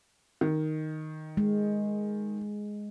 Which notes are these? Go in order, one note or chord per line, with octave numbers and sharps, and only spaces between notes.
D#3
G#3